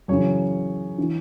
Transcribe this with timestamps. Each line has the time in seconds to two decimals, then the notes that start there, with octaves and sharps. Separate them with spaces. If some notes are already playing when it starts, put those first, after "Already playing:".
0.08 F#2 C#3 E3 C#5
0.98 E3